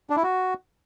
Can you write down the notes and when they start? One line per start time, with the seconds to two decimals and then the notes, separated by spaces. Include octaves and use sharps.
0.10 D4
0.17 E4
0.23 F#4